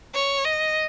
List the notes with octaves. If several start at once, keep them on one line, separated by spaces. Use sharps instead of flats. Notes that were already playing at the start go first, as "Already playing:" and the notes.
C#5
D#5